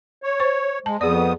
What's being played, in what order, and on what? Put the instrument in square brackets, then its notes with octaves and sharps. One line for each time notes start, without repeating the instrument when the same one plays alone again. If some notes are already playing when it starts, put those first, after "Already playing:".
[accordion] C#5
[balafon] C5 C#6
[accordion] G#3 [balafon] A5
[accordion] F2 B3 D#6 [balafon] G#4 D5